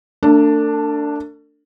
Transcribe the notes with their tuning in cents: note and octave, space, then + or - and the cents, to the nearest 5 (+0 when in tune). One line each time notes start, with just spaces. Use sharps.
A3 +40 D4 +0